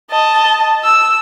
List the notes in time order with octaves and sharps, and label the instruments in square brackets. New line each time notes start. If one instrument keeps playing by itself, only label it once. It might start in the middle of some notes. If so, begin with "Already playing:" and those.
[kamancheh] D#5 A5
E6